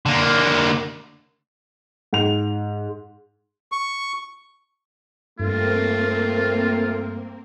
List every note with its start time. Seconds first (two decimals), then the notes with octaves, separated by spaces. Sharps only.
0.06 D3 A#3
2.13 G#2 F7
3.72 C#6
5.39 G2 A3 A#3 C4 F4 A#4